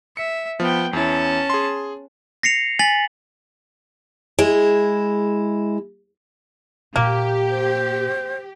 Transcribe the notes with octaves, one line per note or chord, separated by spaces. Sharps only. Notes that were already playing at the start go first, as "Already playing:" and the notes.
E5 C#7
F3 B3 G5
E2 C#4 E4 A5
G#4 C6
A#6 C7 C#7 F7
G#5 A6 B6 F#7
G#3 E4
A#2 A#3 G4
C5